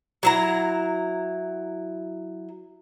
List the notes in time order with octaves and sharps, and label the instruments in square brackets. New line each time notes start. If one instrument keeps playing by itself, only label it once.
[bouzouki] F#3 E4 A#5